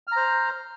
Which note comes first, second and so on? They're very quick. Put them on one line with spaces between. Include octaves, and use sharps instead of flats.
F6 A#5 C5